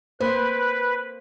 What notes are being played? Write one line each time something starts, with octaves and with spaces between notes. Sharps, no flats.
A#3 B4 C5